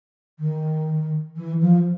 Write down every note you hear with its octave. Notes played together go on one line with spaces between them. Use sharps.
D#3
E3
F3